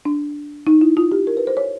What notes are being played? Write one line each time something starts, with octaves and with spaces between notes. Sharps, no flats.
D4
D#4
E4
F4
G4
A#4
B4
C5
C#5